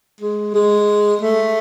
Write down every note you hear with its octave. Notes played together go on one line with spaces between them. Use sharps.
G#3
G#3
A3